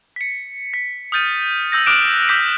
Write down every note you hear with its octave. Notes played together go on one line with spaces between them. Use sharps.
B6 C#7
B6
D#6 F6 G6 A6 D#7
D#6 E6 G6 A#6
D6 D#6 F6 F#6 D7 E7
D6 E6 G6 B6 D7